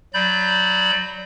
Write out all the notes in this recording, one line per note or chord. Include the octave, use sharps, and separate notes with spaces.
F#3 D5 B5 G6